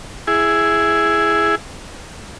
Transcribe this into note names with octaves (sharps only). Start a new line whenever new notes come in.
E4 G#4